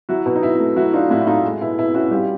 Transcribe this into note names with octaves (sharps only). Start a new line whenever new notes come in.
F#3 E4 F#4
B2
D#4
B2 E4
A3
F#3 E4 F#4
D4 D#4 F4
A2 E4 F#4
E4
A3 D#4 F4
G#3
B2 E4
B2 E4
C#4 E4 F#4
G3 F4 G4